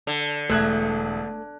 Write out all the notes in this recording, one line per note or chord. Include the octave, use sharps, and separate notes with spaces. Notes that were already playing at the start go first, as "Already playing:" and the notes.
D3
E1 A3 F#6 G#6